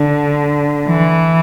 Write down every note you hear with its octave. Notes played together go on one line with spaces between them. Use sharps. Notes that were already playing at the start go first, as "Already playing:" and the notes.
Already playing: D3
E3